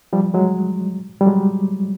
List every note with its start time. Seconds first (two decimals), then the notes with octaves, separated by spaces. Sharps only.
0.13 F3 G3
0.34 F#3 G#3
1.21 G3
1.26 F#3 G#3